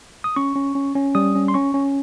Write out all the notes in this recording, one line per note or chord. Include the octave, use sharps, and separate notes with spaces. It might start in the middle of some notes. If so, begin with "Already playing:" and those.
D#6
C#4 C#6
C#4
C#4
C#4
G3 D#6
C#4
C6
C#4 C#6
C#4